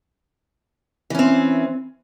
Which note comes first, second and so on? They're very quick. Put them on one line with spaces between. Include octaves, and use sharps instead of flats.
E3 C#4 C4